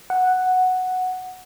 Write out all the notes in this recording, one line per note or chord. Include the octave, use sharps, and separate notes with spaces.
F#5